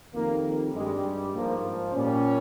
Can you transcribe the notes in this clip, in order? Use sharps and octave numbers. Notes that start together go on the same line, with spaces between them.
F2 D#3 G3 A#3
G2 G3 G#3
G#2 F3 A#3
A#2 G3 C#4